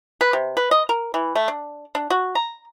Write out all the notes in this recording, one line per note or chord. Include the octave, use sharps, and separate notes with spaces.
B4
C3
B4
D#5
A#4
E3
A3
D4
D4
F#4
A#5